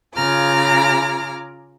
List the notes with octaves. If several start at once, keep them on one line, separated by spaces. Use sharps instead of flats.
C#3 F4 G#4 A#5 D6 F6